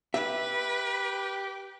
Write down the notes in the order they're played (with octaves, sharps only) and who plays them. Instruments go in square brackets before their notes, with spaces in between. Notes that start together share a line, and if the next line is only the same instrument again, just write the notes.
[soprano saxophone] G4 [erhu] B4 [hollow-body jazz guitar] E5